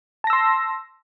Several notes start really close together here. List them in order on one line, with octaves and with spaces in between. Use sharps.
A5 A#6 E6 C6